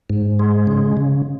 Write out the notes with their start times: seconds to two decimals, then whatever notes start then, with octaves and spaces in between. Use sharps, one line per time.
0.10 G#2
0.39 G#3
0.67 C#3
0.97 C#3